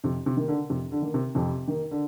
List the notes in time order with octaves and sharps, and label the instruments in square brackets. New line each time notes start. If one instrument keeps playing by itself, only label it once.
[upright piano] F2 [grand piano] C3
[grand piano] C3
[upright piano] D#3 A#3
[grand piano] D3
[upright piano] F2 [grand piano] C3
[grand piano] D3
[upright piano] D#3 A#3
[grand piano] C3
[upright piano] F2 [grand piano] C3
[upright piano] D#3 A#3
[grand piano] D3